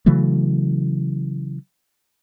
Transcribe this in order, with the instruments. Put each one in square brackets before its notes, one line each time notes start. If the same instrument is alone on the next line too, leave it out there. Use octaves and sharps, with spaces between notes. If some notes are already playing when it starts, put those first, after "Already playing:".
[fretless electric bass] C#3 E3 F#3 A3